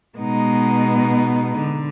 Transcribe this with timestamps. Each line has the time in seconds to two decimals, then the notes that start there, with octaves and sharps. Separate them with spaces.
0.18 B2 G#3 B3 D#4
1.60 D3